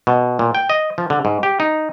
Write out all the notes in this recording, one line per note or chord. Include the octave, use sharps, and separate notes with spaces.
B2
A#2
G5
D#5
F3
D3
G#2
G4
D#4